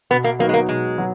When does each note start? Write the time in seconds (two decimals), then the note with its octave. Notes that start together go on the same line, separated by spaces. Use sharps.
0.10 B2 B3
0.24 A#3
0.39 F#3 A#3 B3 D#4 F#4
0.49 G#3
0.54 A#3
0.68 B2 G#3
0.98 F#3 B3